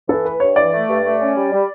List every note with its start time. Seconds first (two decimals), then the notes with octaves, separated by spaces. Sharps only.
0.08 E3 A4
0.25 A3 B4
0.40 G2 C#5
0.56 E3 D5
0.73 A3
0.88 G2
1.05 A3
1.21 C#4
1.36 G3
1.52 G3